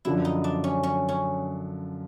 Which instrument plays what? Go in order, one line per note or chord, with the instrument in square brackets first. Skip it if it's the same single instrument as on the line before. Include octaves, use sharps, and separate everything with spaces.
[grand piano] F#2 D3 F3 [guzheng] E4
[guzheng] D#4
D4
C#4
C#4
C#4